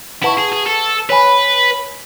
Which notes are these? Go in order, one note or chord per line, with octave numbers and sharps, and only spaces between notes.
E4 B4 F#5 A5 C#6
G#4
G#4
A4
B4 C#5 G#5 B5